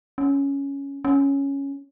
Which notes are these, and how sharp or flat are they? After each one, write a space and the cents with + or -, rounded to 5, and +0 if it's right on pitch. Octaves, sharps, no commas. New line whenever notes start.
C#4 +5
C#4 +0